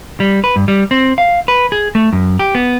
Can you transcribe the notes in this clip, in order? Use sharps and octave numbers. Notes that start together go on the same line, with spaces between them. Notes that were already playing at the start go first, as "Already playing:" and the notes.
G3
B4
G2
G3
C4
F5
B4
G#4
A3
F#2
G4
B3